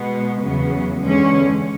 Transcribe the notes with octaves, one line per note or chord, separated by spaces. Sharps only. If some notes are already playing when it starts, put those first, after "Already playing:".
Already playing: B2 G#3 B3
E2 C#3 F#3 B3
E2 D3 G#3 C#4